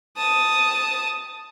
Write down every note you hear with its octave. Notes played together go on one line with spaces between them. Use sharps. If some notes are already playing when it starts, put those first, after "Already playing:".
A5 D#6